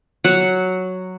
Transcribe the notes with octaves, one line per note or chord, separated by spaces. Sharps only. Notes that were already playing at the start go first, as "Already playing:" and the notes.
F#3 F#5